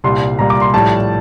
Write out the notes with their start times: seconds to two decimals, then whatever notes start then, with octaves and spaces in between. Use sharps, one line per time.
0.04 C2 A#2 G3 C6
0.39 C2 A#2 G3 A#5
0.50 D6
0.61 C6
0.74 A#1 A2 G3 A5